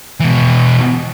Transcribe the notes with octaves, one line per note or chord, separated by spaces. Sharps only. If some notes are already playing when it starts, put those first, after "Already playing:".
B2 E3